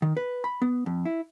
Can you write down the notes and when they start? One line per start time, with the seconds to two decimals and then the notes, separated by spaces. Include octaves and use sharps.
0.02 D#3
0.17 B4
0.44 B5
0.62 B3
0.86 F2
1.05 E4